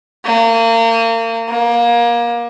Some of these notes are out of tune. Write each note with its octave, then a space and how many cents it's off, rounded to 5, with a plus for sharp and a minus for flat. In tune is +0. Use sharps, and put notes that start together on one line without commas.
A#3 -35
A#3 +25